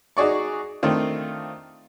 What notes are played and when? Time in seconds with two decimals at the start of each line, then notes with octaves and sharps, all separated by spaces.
0.17 D#4 F#4 G#4 D5 C#6
0.83 D#3 A3 C4 D4 F4